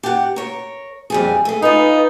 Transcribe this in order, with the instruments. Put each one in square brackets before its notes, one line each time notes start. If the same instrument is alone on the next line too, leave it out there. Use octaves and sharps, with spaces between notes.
[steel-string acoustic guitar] G4 F#5
A#4 C#5
F2 G3 G#4
A3 G#4
[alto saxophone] D#4 [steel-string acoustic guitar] F4 B4